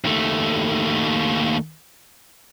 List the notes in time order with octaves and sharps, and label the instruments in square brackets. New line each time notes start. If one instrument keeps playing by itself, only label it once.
[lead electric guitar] D#2 A3